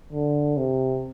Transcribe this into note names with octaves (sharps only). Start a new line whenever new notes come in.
D3
C3